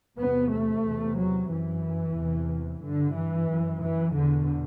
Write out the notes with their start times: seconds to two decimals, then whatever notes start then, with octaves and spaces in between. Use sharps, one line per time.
0.18 E2 C3 B3
0.51 A3
0.84 E2 C3
1.17 F#3
1.50 F#2 E3
2.16 E2 C3
2.82 G2 D3
3.15 E3
3.48 F#2
3.81 E3
4.14 E2 B2 D3